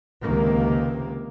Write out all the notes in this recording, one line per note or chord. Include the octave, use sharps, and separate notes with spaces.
C#2 C3 D#3 A#3